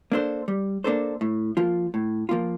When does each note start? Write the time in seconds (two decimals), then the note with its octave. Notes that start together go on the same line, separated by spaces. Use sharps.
0.12 A#3 D4 A4 C5
0.48 G3
0.84 A#3 D4 A4 C5
1.21 A2
1.57 F3 A#3 F4
1.94 A2
2.29 F3 A#3 F4